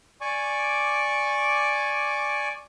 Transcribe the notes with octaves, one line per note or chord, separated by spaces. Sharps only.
D5 G#5 C#6 D6